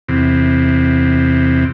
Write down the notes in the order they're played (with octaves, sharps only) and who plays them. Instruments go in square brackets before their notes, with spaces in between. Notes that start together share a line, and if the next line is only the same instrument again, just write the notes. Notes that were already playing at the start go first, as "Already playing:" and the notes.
[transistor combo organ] E2 C3